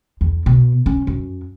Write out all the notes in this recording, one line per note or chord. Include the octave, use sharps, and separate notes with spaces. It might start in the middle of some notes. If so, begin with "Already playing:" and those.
E2
B2
C#4
F#2